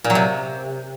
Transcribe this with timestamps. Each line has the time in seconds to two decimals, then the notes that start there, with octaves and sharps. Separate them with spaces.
0.04 A#2
0.10 F#3
0.15 C3